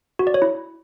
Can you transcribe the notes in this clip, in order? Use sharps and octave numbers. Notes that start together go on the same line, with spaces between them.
F#4
D5
C#5
E4